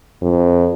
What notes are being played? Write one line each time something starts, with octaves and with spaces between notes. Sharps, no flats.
F2